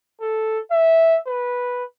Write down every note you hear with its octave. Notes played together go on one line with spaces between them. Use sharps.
A4
E5
B4